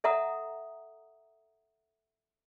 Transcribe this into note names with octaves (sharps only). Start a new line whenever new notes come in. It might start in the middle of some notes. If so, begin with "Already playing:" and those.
A4 E5 F#5 A#5 D#6